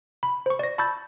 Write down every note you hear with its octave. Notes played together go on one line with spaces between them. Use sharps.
B5
C5 C#6
D5 A#6
A5 B5 C#6 E6 G6 A6